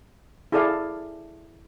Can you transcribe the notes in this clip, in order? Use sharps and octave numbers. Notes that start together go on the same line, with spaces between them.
E4 G#4 A4 D5 F5